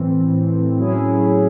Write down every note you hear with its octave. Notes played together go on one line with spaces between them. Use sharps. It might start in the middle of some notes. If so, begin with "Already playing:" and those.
Already playing: A2 E3 C4
A2 F#3 C#4 E4 G#4